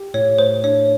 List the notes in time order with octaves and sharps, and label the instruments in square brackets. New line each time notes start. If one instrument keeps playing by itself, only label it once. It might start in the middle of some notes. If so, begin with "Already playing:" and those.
Already playing: [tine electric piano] G4
[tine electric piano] A2 [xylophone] C#5
[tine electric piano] A3 [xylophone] C5
[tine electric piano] D4 [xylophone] C#5